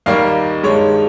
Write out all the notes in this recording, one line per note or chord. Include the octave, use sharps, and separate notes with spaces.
D#2 D#3 G3 A#3 F5
G2 D#3 G#3 C#5